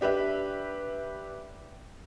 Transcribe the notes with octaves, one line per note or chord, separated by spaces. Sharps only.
D4 G4 B4 E5